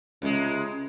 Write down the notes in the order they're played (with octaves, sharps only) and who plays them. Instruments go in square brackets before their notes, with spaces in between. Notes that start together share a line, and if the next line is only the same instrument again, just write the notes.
[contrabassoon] C#2 [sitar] C3 G#3